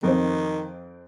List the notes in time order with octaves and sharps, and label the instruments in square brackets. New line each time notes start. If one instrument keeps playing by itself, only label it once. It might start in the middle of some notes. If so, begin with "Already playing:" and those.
[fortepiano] F2 C4 [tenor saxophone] D#3